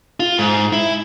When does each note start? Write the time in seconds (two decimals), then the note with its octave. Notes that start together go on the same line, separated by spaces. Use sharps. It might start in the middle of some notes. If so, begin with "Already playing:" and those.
0.20 F4
0.39 G#2
0.73 E4